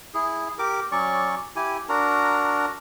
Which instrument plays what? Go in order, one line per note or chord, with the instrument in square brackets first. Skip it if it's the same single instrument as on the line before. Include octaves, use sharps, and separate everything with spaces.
[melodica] E4 G#4
G4 A#4 D6
F#3 C#4 D5 C#6
E4 G4 G#5
D4 F#4 A#4 A#5